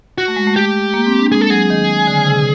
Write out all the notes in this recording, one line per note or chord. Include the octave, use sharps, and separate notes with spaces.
F#4
A3
G#3
A3
G4
A#3
C4
D4
G#3 G#4
A4
F#3 G#4
D#3
D3
C#3
C3
B2